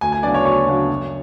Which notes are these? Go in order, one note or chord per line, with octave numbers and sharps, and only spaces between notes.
D2 G#5
G#5
C#3 F#3 B3 D4 D5
C#5
D2 C#5
C#3 F#3 B3 D4
F#2